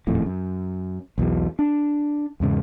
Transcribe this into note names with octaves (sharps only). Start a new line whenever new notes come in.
D#1 F2 A2
F#2
B1 E2 B2
D4
E2 G#2 C#3